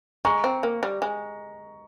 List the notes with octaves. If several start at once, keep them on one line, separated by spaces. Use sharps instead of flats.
G#3 A#5 C#6
C4
A#3
G3
G#3